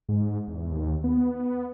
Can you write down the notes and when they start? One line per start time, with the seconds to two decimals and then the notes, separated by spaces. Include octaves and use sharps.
0.09 G#2
0.48 E2
0.71 D#2
1.04 B3